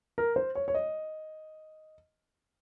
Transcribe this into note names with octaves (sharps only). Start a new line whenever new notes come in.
A#4
C5
C#5
C#5
D#5